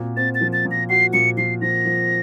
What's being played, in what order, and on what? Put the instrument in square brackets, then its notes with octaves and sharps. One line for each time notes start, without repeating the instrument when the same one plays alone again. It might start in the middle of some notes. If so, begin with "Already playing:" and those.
Already playing: [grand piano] A#2 C4 F#4
[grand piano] C4 [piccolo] A6
[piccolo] A6
[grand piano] F3
[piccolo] A6
[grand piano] A#2
[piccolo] A#6
[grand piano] F#4 [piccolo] C7
[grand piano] A#2 [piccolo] C#7
[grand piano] F3 [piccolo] C7
[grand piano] F3 [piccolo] A#6
[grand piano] F3